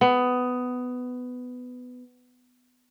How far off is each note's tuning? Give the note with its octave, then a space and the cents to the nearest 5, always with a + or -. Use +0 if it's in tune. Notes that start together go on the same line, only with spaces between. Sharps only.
B3 +15